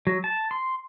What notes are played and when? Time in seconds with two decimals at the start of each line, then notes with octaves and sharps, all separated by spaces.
0.07 F#3
0.24 A5
0.51 C6